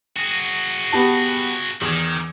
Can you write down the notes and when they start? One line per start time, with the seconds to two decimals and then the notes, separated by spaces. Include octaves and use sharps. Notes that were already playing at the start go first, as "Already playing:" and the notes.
0.16 F#4 G#4
0.92 B3 G4 A5
1.81 E2 D#3 G#6